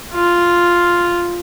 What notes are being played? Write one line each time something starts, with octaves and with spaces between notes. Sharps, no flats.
F4